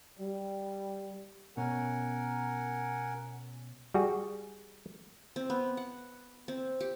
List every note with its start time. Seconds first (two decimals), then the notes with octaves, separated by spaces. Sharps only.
0.18 G3
1.57 B2 C#4 A#4 F#5 G#5
3.94 G3 F#4 G#4
5.36 C4
5.50 B3
5.77 F#5
6.48 C4
6.80 G4